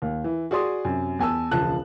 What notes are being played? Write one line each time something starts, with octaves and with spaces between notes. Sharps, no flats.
D#2
E3
F#4 G#4 D5 C6 D#6
F#2 C3
E2 G#5 A5 E6
E1 C#2 F3 A5 F#6